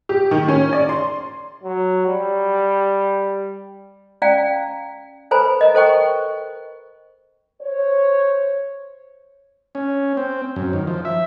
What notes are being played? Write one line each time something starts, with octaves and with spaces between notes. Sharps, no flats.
G4
D#3
C#4
D5
C6
F#3
G3
C#4 D5 F5 G5 A#5
A4 B4 C5 G#5 A#5 B5
A#4 D#5
A4 C5 G5 C#6
C5 C#5
C#4
C4
F#2
D#3
F3
E5